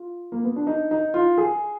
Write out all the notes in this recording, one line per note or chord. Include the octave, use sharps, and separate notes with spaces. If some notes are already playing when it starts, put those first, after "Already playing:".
Already playing: F4
A#3
B3
D4
D#4
D#4
F4
G#4